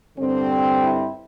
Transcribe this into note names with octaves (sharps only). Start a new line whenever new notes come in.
G2 D3 G3 C4
E4